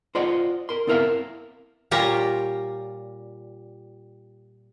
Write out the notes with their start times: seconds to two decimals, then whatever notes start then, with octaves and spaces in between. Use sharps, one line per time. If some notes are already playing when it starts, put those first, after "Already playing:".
0.15 F4 C5 D5 D#5 F5 F#5
0.69 A#4 C6
0.87 B3 C4 E4 A#4 E5 F5
1.91 A#2 G3 F4 G4 C#5 A#5